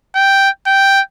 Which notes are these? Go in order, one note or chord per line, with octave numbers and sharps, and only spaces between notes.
G5
G5